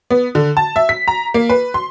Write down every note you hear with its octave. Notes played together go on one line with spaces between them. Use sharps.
B3
D3
A5
E5
B6
A#5
A#3
B4
C6